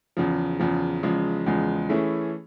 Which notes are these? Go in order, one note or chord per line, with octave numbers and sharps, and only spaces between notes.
E2 C#3 F3
E2 C#3 F3
E2 C#3 F3 G#3
E2 C#3 F3 G#3
E3 A3 C#4 E4 G#4